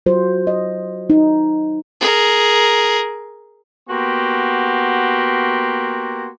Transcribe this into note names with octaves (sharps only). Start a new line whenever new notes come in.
F#3 F4 C5
D#5
D#4
G#4 A#4
A#3 B3 F#4 G4 C6